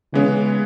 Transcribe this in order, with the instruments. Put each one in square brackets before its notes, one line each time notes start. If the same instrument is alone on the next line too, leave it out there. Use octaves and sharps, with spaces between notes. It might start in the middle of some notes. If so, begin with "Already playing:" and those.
[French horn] C#3 [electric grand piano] E3 G#3 B3